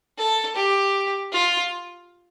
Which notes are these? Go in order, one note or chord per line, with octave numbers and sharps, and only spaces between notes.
A4
G4
F4